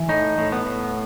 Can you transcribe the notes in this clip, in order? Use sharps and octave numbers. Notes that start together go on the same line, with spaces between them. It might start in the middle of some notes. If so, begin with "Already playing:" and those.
Already playing: E3
A2 D#4
A2
B3
A2